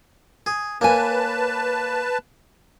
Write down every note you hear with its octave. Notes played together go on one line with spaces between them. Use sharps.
G#4
A#3 B4 C#5 G#5 A5